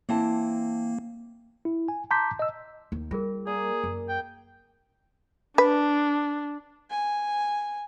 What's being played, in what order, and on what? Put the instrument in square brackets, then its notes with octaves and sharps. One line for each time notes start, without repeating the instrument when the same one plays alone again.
[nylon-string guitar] E3 C4 A5 [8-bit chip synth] A#3
[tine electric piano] E4
G#5
A5 A#5 C6 D6 G6 B6
D#5 E6
[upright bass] D#2
[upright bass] G3 [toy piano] F4 G#4 A#4
[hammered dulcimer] A#3 [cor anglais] G#4 [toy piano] D5
[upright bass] F#2
[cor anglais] G5
[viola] D4 [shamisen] B4
[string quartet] G#5